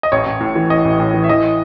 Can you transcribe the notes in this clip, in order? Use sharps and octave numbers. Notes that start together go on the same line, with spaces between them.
D#5
A1 C#5
A1
A2
E3
A1 D#5
A1
A2
E3
E5
E3 D#5